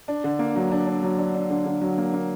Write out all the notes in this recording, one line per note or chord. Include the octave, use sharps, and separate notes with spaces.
D4
D3
A#3
F#3
D4
D4
F#3
D4
D4
D3
D3
F#3
A#3
A#3